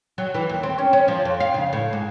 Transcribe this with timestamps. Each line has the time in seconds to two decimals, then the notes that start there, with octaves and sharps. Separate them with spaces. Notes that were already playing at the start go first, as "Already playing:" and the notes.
0.18 F#3
0.34 E3
0.49 D#2
0.63 C4
0.78 C#4
0.93 C#4
1.08 F3
1.25 F2
1.40 F5
1.54 C#3
1.73 A2
1.93 G#2